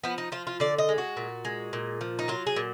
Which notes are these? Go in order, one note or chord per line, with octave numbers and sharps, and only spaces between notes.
F3 B3
D#4
F3 F4
F4
D3 D5
D#5
G#3
F#4
A#2
G#3
A#2
F3
D#4
F#3 F4
G#4
A#2